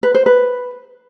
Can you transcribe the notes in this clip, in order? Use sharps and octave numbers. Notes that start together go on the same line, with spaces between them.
B4
C5
B4